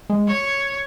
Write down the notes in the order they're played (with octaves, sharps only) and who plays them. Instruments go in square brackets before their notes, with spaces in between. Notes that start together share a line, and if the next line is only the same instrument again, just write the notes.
[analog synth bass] G#3
[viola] C#5